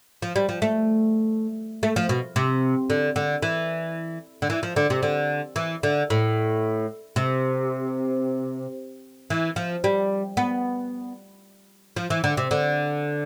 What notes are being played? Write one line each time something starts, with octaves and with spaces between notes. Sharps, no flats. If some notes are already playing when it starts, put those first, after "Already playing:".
F3
G3
F3
A3
A3
F3
B2
C3
D3
D3
E3
D3
E3
F3
D3
C3
D3
E3
D3
A2
C3
E3
F3
G3
B3
F3
E3
D3
C3
D3